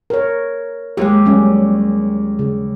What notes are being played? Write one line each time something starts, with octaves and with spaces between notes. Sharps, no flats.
A#4 C#5
D#2 G#3 G4
F#3 G3 C#4
C#3